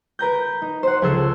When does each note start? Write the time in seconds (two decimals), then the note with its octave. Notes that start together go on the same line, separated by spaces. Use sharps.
0.19 A#4 B4 A#5 G6
0.62 D#4
0.83 C5 F#5
1.02 C#2 F3 G#4 A4 E6